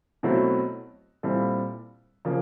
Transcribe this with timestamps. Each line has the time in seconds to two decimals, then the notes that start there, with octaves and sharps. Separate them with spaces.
0.23 B2 F#3 A3 C4 E4
1.23 A#2 G3 C4 E4 A4
2.25 C#3 F3 A#3